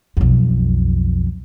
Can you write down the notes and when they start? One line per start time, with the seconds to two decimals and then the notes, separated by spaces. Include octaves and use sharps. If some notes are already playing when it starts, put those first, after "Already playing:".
0.17 B1 F2